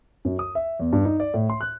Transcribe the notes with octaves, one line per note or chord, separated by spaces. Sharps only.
F#2
D#6
E5
E2
G2
D#4
D5
A2
C6
F#6